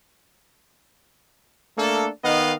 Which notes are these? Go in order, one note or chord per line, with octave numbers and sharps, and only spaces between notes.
A3 A#3 D4 A4
D#3 B3 D#4 D#5 F5